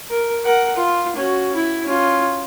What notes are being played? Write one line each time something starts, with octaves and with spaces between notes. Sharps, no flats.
A#4
A#4 F#5
F4
C#4 F#4
E4
C#4 F4